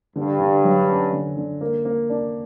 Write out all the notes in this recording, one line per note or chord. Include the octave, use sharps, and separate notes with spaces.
G2 D3
D3
F#3
C#4
D3
D3
A#3
A#3
D4